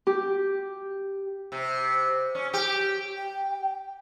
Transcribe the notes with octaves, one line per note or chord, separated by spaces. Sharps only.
G4
C3
C#4
G4
G5